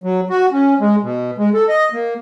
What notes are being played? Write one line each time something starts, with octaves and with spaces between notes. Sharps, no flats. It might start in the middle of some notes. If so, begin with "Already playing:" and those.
F#3
F#4
C#4
G#3
B2
G#3
A4
D#5
A#3